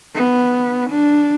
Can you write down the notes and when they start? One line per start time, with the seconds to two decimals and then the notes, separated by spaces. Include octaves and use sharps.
0.15 B3
0.90 D4